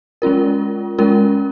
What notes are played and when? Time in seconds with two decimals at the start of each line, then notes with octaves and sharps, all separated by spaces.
0.22 G#3 C#4 F4 A#4
0.98 G#3 C#4 F4 A#4